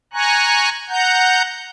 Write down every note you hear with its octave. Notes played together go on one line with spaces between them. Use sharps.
G#5 A#5 C#6 F#6
F#5 A#5 G6